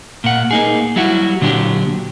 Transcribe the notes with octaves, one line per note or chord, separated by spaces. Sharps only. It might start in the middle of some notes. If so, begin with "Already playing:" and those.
A#2 F#5
A#3 D#4 G#4
F#3 G3 E4 F#4
A#2 D3 F#3 D4 G4